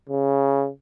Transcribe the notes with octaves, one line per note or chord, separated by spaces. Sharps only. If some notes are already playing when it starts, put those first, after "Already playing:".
C#3